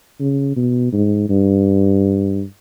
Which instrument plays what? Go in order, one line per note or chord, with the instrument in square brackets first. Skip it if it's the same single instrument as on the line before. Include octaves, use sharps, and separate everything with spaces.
[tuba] C#3
B2
G#2
G2